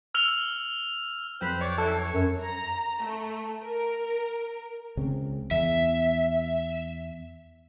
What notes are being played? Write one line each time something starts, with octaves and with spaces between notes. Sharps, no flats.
E6 F6 F7 G7
F2 F#3 B4 C5 G5
C#5 D5
E3 C#4 E4 A4
C#5
F#2
A#5
A3
A#4
C#2 C#3 C4
E2 E5